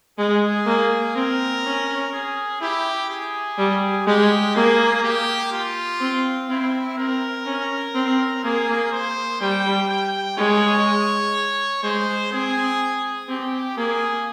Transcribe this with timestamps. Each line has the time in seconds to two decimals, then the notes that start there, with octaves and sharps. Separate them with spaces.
0.18 G#3 G#4
0.66 A#3
1.15 C4 A#4
1.64 C#4
2.12 G#4
2.61 E4 G4
3.09 G#4
3.58 G3
4.06 G#3 G4
4.55 A#3 G#4
5.03 G4
5.52 F4
6.01 C4
6.49 C4 E4
6.97 C4 A#4
7.46 C#4
7.95 C4
8.43 A#3 G#4
8.92 C5
9.41 G3 G5
9.89 G5
10.37 G#3 C#5
11.83 G#3 C5
12.32 C4 G#4
13.28 C4 G4
13.77 A#3 G#4